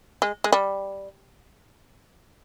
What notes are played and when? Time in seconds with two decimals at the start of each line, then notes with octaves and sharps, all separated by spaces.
0.22 G#3
0.44 G#3
0.52 G3